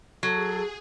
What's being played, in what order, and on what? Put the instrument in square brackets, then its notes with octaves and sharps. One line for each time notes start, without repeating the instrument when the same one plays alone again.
[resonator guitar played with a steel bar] F#3 [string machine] G#4 [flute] A4